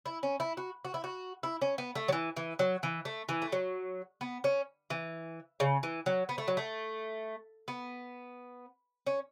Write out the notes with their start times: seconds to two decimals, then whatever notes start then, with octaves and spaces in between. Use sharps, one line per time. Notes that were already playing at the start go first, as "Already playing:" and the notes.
0.06 E4
0.23 C#4
0.40 E4
0.57 F#4
0.85 F#4
0.94 E4
1.04 F#4
1.43 E4
1.61 C#4
1.78 B3
1.95 A3
2.08 F#3
2.12 E3
2.37 E3
2.59 F#3
2.83 E3
3.05 A3
3.29 E3
3.42 A3
3.52 F#3
4.21 B3
4.44 C#4
4.90 E3
5.60 C#3
5.83 E3
6.06 F#3
6.29 B3
6.38 A3
6.48 F#3
6.57 A3
7.68 B3
9.07 C#4